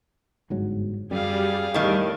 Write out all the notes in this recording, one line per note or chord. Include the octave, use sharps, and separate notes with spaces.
G1 G#2 F#3
F#2 G3 G#4 F5
E2 A2 D#3